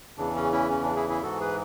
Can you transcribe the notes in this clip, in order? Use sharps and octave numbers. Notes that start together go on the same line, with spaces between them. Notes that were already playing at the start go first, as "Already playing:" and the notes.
E2 C#3 E3 D4
C#4
C#4 E4
C#4
D4
E4 G#4
E4 G#4
G#2 E3 F#4 A4
G#4 B4